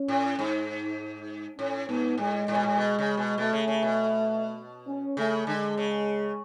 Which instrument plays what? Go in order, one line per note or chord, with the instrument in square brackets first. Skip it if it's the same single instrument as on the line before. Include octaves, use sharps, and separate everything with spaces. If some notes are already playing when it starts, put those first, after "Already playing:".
Already playing: [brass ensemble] C#4
[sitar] A2
G#2
[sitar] A2 [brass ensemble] C#4
[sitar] G#2 [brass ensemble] B3
[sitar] A2 [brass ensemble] G#3
[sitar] A2
B2
A2
B2
C#3
B2
[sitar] B2 [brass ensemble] A3
[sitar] C#3
C#3
B2
[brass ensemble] C#4
[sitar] C#3 [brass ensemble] A3
[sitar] D3 [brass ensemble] G#3
[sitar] C#3